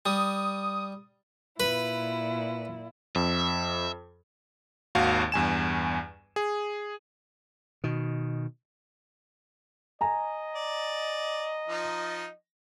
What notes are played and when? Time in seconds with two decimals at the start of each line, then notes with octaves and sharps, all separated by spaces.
0.06 G3 D#6
1.60 A#2 E4 B4
3.16 F2 E5
4.95 G#1 D#2 F#4 F5
5.32 E2 G2 G#5 E7
6.36 G#4
7.84 B2 D#3
10.01 D#5 G#5 A#5
10.55 D5
11.69 F3 D#4